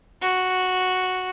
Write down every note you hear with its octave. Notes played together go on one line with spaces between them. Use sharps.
F#4